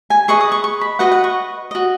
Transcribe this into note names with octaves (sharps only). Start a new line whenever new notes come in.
G#5
G#4 B4 D#5 C#6
D#6
C#6
C#6
B5
F#4 B4 D#5 F#5
F#5
C#6
F#4 D#5